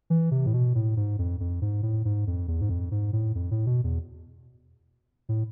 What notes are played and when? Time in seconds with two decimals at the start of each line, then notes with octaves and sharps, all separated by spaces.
0.10 E3
0.31 C3
0.46 A2
0.53 B2
0.75 A2
0.97 G#2
1.19 F2
1.40 F2
1.62 G#2
1.83 A2
2.05 G#2
2.27 F2
2.48 E2
2.61 G#2
2.70 F2
2.91 G#2
3.13 A2
3.35 F2
3.51 A2
3.66 B2
3.84 E2
5.29 A2